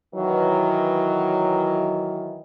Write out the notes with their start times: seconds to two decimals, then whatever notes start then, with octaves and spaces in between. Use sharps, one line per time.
0.15 D#3 E3 F#3